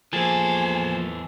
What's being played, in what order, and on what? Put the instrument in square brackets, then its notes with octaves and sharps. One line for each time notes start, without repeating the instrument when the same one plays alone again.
[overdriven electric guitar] E2 A4 [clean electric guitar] F3 A#3 [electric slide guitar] G#4 [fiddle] C5